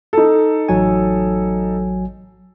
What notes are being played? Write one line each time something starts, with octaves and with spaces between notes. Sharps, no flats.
D#4 A4
A1 F#3 G#5